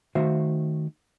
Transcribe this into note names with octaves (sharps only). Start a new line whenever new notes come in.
D#3 A3 F#4 C5 E5 F5